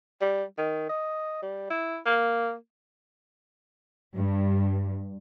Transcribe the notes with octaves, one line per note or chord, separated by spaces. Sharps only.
G3
D#3
D#5
G3
E4
A#3
G2